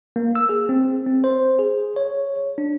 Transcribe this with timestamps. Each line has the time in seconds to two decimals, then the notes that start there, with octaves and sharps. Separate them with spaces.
0.16 A#3
0.35 E6
0.49 G#4
0.69 C4
1.07 C4
1.24 C5
1.59 G#4
1.96 C#5
2.58 D4